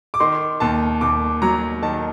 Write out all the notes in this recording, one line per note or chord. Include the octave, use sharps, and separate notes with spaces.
D6
D#3 C6
D#2 A5
D#2 D6
F#3 A#5
D#3 A5